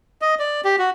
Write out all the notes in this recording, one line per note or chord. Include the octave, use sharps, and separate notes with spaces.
D#5
D5
G4
F#4